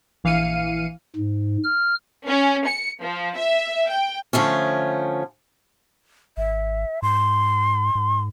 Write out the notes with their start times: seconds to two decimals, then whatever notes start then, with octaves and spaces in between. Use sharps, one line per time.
0.24 A#1 E3 F5 C7 C#7 D#7
1.16 G#2
1.64 F6
2.27 C#4
2.66 C#7
3.02 F3
3.37 E5
3.89 G5
4.33 D3 F3 A3 C#4
6.37 G#1 E5
7.02 G#2 C6
7.95 G#2